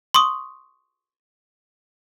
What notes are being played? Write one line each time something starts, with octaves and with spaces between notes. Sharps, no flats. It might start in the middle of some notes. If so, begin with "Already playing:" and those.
C6 C#6 D#6